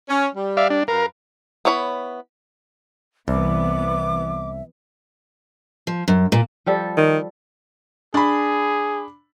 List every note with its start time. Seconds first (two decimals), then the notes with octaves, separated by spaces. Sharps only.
0.09 C#4
0.35 G3
0.57 D5 E5 F5
0.70 D4
0.88 F#2 A#4 B4 F5
1.65 B3 E4 C#5 D#5 B5
3.28 C2 E3 B3 E5 D6
5.87 F3
6.08 F#2
6.32 A#2
6.66 F3 G3 A4
6.97 D#3
8.14 D4 G#4 B5